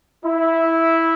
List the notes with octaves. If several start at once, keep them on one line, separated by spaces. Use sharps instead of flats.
E4